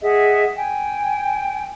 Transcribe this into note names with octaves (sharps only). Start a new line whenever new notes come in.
G#4 D#5 E5 F#5
G5 G#5